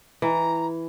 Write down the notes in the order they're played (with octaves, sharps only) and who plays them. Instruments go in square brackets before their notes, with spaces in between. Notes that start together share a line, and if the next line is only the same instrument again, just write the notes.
[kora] E3 [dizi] A#5